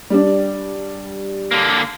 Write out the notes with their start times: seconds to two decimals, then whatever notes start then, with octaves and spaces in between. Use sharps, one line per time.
0.10 G3 D4
1.51 D3 A#3